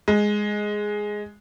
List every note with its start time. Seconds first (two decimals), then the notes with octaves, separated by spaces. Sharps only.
0.08 G#3